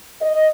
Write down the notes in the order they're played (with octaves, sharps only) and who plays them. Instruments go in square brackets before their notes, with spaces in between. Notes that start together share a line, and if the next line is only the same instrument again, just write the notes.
[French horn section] D#5